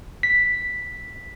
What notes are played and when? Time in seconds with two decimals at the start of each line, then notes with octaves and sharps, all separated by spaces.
0.23 B6